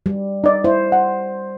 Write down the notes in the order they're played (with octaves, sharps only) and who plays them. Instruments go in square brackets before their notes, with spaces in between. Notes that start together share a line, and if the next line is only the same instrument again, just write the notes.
[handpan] G3
[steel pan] D#4 D5
[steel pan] E4 [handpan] C5
[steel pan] F#5